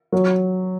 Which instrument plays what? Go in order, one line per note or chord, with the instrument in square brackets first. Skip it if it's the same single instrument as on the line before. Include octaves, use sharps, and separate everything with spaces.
[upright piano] F#3